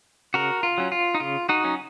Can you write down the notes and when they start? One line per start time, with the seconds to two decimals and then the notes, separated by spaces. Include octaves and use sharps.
0.34 C#3 F#4 A#4
0.63 F4
0.78 F#3 C#4
0.92 F4
1.15 D#4
1.20 C#3 F4
1.49 D#4 F#4
1.64 F#3 C#4